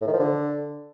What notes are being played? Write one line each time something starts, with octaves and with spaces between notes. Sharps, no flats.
A2
D#3
F3
D3